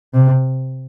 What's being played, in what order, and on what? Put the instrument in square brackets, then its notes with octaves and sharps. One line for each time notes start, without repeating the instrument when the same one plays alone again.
[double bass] C3